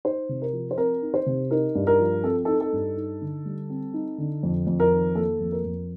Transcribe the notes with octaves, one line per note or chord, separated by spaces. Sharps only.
D#4 C5
C3
A#4
F3
C5
C4 A#4
D#4
C5
C3
D#4 A#4
G2
A#4
F3
C4 A4
D#4 A4
A4
G2
D#4
D3
G3
C4
D#4
D3
F2
F2
A#4
D#3
A#3 A4
F2
A#4
F2